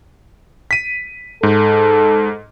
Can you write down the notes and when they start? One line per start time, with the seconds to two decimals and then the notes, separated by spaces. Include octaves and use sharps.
0.71 B6 D#7
1.43 G#2 A4